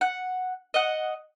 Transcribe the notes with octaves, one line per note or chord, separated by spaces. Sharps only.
F#5
D#5 F#5